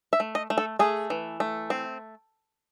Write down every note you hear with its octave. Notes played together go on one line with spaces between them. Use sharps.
E5
A3
D#5
A3
A4
A3 G#4
E3
A3
C4